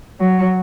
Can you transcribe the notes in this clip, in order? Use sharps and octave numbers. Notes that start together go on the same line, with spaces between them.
F#3